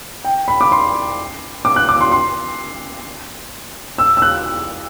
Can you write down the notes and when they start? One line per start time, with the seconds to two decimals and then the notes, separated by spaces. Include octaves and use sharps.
0.25 G5
0.48 B5
0.61 D6
0.72 C6
1.65 D6
1.76 F#6
1.89 D6
2.01 C6
2.12 C6
3.98 E6
4.17 E6
4.22 F#6